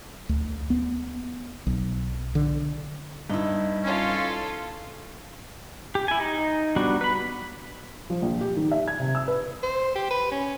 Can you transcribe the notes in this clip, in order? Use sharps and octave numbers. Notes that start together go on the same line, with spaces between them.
D2
B3
B1
D3
G2 D#4 E4
C#4 F4 A4
G4
E4 G#5
D#4
G3 B3 D4 F#4
B4 B5
F3
A#1
G4
D#3
E5
G#6
C3
E6
B4
C5
G4
B4
C#4